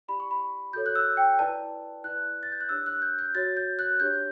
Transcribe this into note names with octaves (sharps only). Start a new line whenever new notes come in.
E4 G4 D5 B5
C#6
B5
F#4 A4 C#5 G6
F#6
E6
G5
E4 B4 D5 A5
E4 B4 D5 F#6
A6
G6
F#6
D4 G4 C#5 E6
F#6
G6
G6
F#4 C#5 A6
G6
F#6
D4 G4 C#5 G6